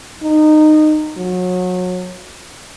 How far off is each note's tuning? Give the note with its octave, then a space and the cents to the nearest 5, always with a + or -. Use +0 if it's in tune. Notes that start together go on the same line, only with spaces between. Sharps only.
D#4 -20
F#3 -30